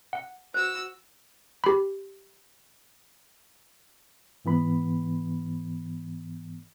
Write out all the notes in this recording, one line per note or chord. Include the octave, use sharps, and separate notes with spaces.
F#5
F#4 C5 E6
G4 B5
G#2 E3 B3 B5